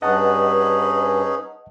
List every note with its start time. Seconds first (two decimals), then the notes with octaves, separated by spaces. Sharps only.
0.02 G2 C#4 D#4 G#4 B4 D#5 F#5 A5